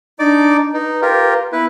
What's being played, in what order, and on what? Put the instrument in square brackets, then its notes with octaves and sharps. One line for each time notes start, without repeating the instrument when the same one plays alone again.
[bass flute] D4 [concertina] D#4 D5 D6
[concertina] D#4 [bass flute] B4
[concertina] F4 G4 A#4
[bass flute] B3 [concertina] E4 B4